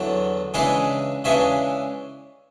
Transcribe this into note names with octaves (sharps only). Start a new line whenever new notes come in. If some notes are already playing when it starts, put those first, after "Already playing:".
Already playing: E2 D3 F#3
C#3 E3 G#3 D4 G#4 B4
C#3 E3 G#3 D4 E5 G#5